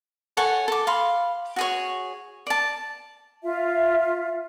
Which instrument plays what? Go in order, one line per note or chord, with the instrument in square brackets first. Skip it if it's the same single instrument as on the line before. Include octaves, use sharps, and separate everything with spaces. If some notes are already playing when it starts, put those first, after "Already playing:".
[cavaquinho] A4 C#5 F#5 G#5
A4 D6
F5 B5 C6
F#4 G#4 C#5
D5 A5
[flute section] F4 E5